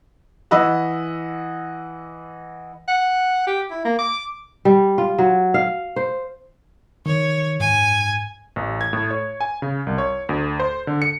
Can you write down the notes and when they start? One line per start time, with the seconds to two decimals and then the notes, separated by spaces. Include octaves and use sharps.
0.51 E3 D#5 F#5 B5 E6
2.88 F#5
3.47 G4
3.71 E4
3.85 A#3
3.99 D6
4.65 G3
4.98 F4
5.18 F#3
5.54 F5
5.96 C5
7.06 D#3 C#5
7.60 G#2 G#5
8.56 A1
8.81 G#6
8.93 A2
9.11 C#5
9.41 G#5
9.62 C#3
9.87 C2
9.98 C#5
10.29 D2
10.60 C5
10.87 D3
11.02 C#7